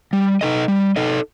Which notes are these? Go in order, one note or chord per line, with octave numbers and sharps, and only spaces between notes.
G3
D#4 A4 D#5
G3
D#4 A4 D#5